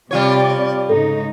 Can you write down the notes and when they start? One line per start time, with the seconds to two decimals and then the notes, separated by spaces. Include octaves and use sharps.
0.11 C3 G3 F4 C#5 D5
0.89 G#2 C#3 D#4 A4